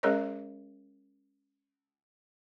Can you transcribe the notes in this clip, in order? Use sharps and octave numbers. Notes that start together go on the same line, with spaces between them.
G#3 C#4 G#4 A#4 C#5 D#5